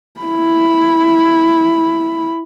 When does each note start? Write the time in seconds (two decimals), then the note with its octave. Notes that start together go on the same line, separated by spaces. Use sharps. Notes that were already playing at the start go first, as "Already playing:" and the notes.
0.21 E4 B5